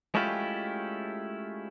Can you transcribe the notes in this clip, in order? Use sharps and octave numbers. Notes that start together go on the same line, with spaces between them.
G#3 A3 C#4 E4 F4 G4